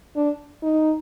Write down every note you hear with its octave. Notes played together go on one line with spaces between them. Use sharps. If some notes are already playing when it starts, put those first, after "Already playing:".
D4
D#4